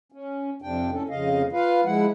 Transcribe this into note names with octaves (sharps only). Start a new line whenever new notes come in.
C#4
F2 C3 D4 G5
A2 C#4 A4
F2 C#3 D#5 F5
F4 B4 F5
F3 G#3 E4 F#5